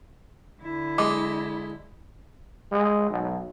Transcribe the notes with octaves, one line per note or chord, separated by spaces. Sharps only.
D3 E4
G#3 D6
G#3
B1